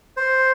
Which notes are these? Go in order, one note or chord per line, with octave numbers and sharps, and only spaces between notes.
C5